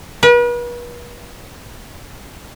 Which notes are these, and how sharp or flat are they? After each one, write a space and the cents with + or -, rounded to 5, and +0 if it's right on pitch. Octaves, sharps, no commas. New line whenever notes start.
B4 -40